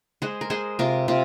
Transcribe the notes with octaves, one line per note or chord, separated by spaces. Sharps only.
G#3 G#4 C5
A#4
G#3 G#4 C5
C3 F4 A#4
C3 F4